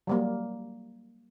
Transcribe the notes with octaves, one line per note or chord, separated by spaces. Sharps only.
F#3 G3 A#3